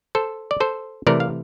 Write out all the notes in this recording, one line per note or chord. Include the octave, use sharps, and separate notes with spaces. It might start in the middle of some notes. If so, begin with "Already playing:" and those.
A4 C5
D5
A4 C5
C3 E3 A3 A#4 D5
F5